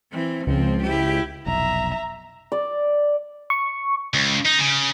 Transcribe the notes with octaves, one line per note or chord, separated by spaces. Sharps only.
E3 C4
C#2 F3 C4
E4 G4
F1 B1 E5 A#5
D5
C#6
C#2
D#4
C#3